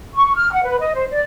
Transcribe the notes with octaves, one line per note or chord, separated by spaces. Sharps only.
C#6
F6
F#5
B4
D#5
C5
D5